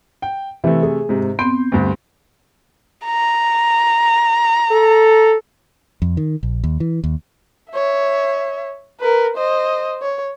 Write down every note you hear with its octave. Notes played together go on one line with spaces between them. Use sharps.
G5
C3 E3 A3
G#4
G#2 C3
B3 C4 C6 G6
D2 G2
A#5
A4
F2
D#3
A#1
D#2
E3
D#2
C#5 E5
A#4 B4
C5 D#5
C#5